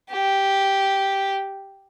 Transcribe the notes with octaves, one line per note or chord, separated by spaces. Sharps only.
G4